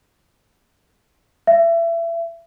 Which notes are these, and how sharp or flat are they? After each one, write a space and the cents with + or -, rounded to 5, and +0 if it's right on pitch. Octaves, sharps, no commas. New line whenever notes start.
E5 +30